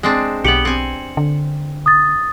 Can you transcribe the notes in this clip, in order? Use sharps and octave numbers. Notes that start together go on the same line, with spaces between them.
G#3 C4 D4
B1 B3 G4 C#7 F#7
C4 G#5
D3
D#6 A6